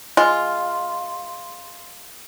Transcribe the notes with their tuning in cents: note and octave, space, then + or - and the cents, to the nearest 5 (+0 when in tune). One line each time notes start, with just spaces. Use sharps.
G#3 +0 F4 +0